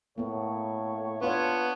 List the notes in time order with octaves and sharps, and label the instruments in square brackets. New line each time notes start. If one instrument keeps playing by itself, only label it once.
[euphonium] A2 [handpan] A#3 B3 [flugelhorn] C#5
[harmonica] B3 [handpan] D4 C#5 [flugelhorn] F4